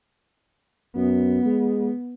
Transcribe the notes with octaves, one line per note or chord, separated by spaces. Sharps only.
F#2 B3
G#3